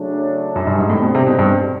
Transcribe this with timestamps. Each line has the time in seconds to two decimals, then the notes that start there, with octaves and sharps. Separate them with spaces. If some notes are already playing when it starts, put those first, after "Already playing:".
Already playing: C#3 F#3 A3 D4
0.56 F#2
0.67 G2
0.79 G#2
0.89 D2 A2 D3 G3 C4 D#4
1.02 B2
1.15 C3
1.26 B2
1.39 G2